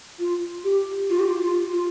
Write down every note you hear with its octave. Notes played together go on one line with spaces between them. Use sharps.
F4
G4
F4
G4
F4
F4
F4